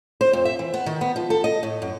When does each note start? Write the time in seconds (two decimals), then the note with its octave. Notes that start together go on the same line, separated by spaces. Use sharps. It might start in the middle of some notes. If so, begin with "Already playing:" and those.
0.21 C5
0.33 F2
0.45 E5
0.59 E3
0.74 B3
0.86 D#3
1.01 B3
1.16 F3
1.30 A4
1.44 D#5
1.63 A2
1.82 F#2